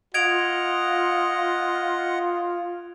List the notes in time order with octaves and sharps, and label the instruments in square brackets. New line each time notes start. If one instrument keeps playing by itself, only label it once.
[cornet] F4 [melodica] D#5 F#5 [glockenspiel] G#6 D7 F7